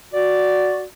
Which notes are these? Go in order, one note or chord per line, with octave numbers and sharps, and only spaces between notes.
F#4 D5